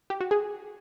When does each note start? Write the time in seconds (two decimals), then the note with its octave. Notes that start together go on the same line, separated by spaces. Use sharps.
0.10 G4
0.21 F#4
0.31 G#4